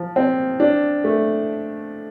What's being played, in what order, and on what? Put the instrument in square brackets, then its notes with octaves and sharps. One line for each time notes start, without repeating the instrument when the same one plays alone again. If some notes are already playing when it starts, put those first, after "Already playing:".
Already playing: [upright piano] F3
C4
D4
A3